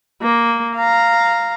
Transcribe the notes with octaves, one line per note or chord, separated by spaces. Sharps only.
A#3
F5 A#5